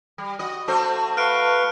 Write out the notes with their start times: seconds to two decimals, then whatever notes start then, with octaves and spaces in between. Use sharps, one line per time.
0.18 G3
0.39 F#4 D#5
0.68 A3 F#4 C5
1.17 B4 F5 C#6 F6 F#6 D7